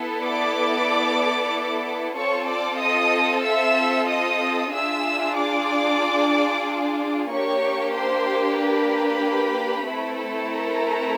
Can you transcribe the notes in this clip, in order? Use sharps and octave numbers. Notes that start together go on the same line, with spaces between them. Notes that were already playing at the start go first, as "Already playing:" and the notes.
Already playing: B3 E4 A4
D5 D6
C4 F4 A4 C#5 C#6
D5 D6
D#5 D#6
E5 E6
D#5 D#6
D4 F4 G#4 E5 E6
D5 D6
A#3 D4 G4 C#5 C#6
C5 C6
B4 B5
A3 C4 E4 A4
A#4 A#5